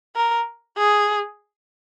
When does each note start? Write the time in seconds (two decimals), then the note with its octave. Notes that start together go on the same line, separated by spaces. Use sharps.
0.16 A#4
0.77 G#4